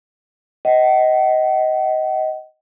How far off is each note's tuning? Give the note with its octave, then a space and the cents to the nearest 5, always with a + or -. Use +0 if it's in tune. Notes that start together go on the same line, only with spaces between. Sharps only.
D#5 +15 F#5 +45